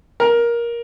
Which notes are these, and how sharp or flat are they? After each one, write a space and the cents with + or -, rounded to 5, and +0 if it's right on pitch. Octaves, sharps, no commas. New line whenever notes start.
A#4 +15